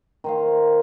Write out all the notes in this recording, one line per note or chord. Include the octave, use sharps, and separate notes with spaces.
D#3 C5 F5